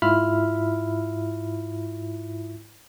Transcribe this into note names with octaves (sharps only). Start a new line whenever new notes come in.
G#2 E4 F4 E5 B5 F6